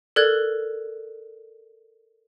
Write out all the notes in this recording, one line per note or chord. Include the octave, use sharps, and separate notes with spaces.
A4 A#4 D5 F#6 G#6